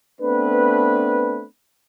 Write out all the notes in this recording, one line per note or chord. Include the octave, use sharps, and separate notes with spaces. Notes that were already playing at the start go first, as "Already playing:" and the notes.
A3 B3 C4 D4 B4